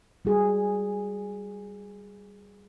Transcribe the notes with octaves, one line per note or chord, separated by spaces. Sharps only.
G3 F#4 G#4